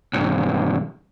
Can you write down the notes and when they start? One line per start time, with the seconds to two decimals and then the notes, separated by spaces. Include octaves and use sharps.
0.13 B1 G2